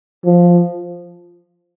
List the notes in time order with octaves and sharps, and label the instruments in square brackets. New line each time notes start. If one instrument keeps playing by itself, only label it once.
[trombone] F3